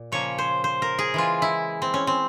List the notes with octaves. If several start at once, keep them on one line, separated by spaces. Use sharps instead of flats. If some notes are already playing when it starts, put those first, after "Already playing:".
Already playing: A#2
C#3 F3 A#3 C#5
C5
C5
A#4
G#4
E3 G#3 F4
E4
C4
C#4
C4